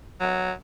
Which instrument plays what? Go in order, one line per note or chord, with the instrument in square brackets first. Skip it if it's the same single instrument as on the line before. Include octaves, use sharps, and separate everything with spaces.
[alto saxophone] F#3